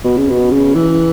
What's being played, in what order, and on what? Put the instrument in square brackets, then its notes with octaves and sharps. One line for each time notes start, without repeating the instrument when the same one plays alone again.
[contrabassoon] B2
C#3
B2
C#3
E3